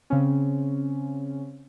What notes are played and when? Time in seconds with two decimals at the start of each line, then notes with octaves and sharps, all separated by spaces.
0.10 C#3 C4 C#4